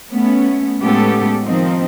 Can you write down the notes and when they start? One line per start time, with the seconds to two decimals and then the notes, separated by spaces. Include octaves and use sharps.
0.10 A3 B3 C#4
0.79 A2 G#3 B3 C#4 G4 A4
1.44 D#3 F3 C4 D#4